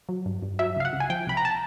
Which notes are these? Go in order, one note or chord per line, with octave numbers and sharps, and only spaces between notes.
F#3
G2
G2
F#3 E5
C#2 F5
F#5
C#2
G#5
F3 G5
C2 B5
A#5
A5